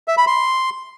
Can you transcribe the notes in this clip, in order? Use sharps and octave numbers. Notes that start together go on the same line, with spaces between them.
E5
B5
C6